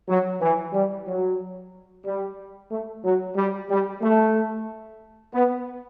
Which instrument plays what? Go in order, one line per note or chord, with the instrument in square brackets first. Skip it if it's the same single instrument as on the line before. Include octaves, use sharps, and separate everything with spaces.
[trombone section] F#3
E3
G3
F#3
G3
A3
F#3
G3
G3
A3
B3